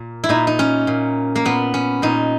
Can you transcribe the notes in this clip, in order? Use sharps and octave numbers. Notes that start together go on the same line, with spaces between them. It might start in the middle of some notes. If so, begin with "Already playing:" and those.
Already playing: A#2
E4
A#2 D#4
D#4
C#4
A#2
A#3
A#2 B3
C#4
A#2 D#4